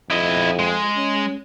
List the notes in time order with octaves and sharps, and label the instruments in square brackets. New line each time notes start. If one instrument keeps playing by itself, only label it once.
[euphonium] F2 [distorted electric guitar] E4 D#5
[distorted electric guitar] G#3
[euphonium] C#4